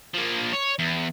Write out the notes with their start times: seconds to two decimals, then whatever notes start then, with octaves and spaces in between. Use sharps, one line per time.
0.14 F3 A#3
0.53 C#5
0.79 E2